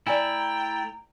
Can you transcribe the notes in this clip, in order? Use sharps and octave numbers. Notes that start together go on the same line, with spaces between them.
A3 E4 D5 G5 G#5 A#5